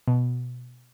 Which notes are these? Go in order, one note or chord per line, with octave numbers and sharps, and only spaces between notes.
B2